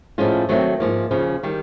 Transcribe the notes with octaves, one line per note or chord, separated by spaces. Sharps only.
A2 F3 G#3 C#4 F4
D#3 F#3 A3 C4
G#2 F3 A#3
D#2 C#3 F3
D#3 G3